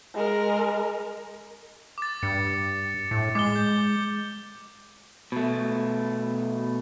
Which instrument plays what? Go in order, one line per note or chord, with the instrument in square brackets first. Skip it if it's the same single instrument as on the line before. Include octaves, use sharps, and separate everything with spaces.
[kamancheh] G#3 A#4
[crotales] D6 A6
[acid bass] G2 [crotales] C#7
[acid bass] A2
[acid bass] G#3 [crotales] D6 G7
[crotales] G6
[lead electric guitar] B2 A3